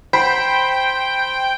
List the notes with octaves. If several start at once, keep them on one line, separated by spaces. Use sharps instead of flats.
C5 G5 B5